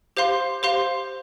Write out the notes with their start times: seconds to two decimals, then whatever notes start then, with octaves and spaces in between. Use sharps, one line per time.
0.17 G4 C5 F5 C6
0.63 G4 C5 F5 C6